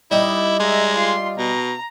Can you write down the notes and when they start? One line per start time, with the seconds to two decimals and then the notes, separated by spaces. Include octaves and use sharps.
0.11 G3 D#4 E4
0.60 G#3 E5 A#5
0.96 F4 C6
1.38 B2 A#5